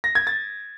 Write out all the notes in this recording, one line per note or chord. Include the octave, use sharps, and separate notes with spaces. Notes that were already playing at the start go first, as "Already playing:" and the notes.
A#6
G#6
A6